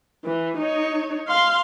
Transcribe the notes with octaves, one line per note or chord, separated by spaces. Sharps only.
E3
D#4 C#5
F5 C6